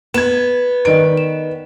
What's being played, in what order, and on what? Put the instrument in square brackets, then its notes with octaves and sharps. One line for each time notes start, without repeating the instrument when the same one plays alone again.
[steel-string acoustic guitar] B3 [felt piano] G#6 E7
[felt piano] D#3 D7 [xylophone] B4 D5 D#5
[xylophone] E7